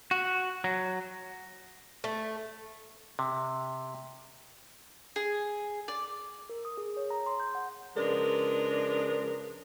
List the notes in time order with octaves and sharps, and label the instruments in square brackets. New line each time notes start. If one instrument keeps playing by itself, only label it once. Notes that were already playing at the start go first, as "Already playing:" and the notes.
[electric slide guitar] F#4
F#3
[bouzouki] A3
[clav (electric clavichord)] C3
[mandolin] G#4
D5
[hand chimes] A#4
D#6
G#4
C#5
A#5
C6
G6
F#5
[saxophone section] C#3 F3 G#3 D4 A#4 B4